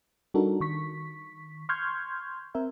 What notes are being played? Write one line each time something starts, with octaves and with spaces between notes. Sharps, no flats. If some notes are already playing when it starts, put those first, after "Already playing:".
G3 D4 D#4 F#4 A4 A#4
D#3 C#6 B6
C6 C#6 F6 G6 G#6
C4 A#4 E5